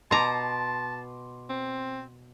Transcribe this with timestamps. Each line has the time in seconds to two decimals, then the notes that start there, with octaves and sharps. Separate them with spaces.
0.11 B2 A5 A#5 C6 D6
1.50 C4